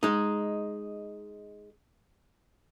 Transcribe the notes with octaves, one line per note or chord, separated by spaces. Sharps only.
G#3 D#4